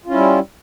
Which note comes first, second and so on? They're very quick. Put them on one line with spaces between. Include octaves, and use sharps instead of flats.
F4 C#4 E4 G3